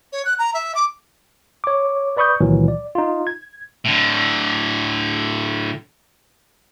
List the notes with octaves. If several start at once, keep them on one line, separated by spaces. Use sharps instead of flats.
C#5
F#6
A#5
E5
D6
C#5 D6
B4 D5 B5 C#6 D#6 G6
C#2 A#2 D#3 E3 F#3
D5
D#4 F4
G#6
A2 D3